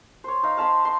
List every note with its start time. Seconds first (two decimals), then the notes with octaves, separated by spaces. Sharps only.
0.24 C5 C#5
0.43 D#4 F5
0.57 F5 A5 B5 C6
0.85 C6